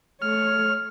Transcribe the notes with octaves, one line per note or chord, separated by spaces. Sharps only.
A3 C#5 F6